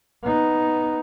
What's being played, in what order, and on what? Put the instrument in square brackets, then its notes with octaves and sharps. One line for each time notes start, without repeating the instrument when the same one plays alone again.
[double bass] B3 D#4